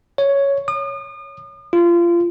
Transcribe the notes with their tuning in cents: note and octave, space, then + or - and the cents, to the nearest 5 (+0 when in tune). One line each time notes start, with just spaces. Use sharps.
C#5 +5
D#6 -40
F4 -25